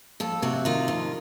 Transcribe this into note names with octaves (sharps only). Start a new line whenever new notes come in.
F2 A4
C3 F#4
D#3 F4
F2